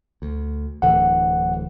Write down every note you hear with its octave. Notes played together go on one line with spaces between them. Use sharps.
D2
D1 D3 E3 F#5